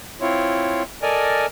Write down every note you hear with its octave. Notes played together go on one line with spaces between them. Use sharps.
C4 E4 F4 C#5
A4 A#4 D5 D#5 G#5 F6